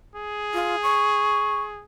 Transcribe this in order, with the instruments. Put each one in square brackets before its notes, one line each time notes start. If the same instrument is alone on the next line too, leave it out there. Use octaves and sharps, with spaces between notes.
[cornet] G#4
[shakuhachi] F4
C#6